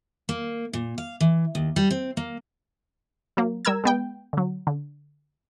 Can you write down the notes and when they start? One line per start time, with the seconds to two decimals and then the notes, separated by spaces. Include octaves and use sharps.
0.29 A#3
0.73 A#2
0.98 F5
1.20 E3
1.55 D#2
1.76 G3
1.91 C4
2.17 A#3
3.37 F#3 A#3
3.65 G3 A#4 A#5 E6 G#6
3.84 G#3 B3 G5
4.33 D3 F#3
4.67 D3